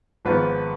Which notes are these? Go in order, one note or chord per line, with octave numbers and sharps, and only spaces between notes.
G#1 G#2 F3 B3 F4 B4